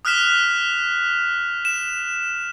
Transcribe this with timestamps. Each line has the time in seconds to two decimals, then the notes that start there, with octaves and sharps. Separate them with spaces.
0.05 D#6 F6 F#6 B6 E7
1.65 E7